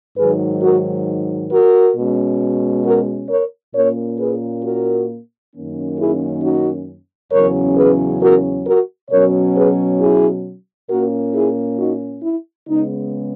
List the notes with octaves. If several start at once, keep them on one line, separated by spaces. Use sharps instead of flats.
G#2 D#3 F#3 G#4 B4
F#4 A#4
F#4 A#4
B2 G#3 C#4
F#4 A#4
A#4 C#5
A#2 A#3 C#4 A#4 C#5
G#4 B4
F#4 A#4
F#2 D#3 A#3 C#4
E4 G#4
D#4 F#4
E2 C#3 F#3 C#4 A#4 C#5
G#4 B4
F#4 A#4
F#4 A#4
B2 F#3 C#4 A#4 C#5
G#4 B4
E4 G#4
A#2 A#3 C#4 F#4 A#4
E4 G#4
D#4 F#4
E4
C#3 G#3 B3 D#4